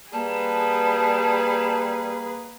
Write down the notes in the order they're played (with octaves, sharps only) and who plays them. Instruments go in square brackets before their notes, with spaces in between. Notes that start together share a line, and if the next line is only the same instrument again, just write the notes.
[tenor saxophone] G3 [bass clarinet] A#3 [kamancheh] G#4 B4 [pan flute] A5